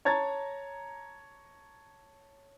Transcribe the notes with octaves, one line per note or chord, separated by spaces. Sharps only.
C#5 A5 A#5 G#6 A6